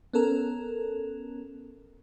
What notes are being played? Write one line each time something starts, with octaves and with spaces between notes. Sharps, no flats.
B3 C#4 A4 A#4